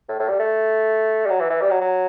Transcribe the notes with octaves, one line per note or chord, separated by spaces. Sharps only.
A2
A2
G3
A3
G3
F#3
E3
E3
G3
F#3
F#3